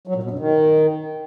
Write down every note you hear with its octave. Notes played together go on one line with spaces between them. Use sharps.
F#3
A#2
B2
G2
D#3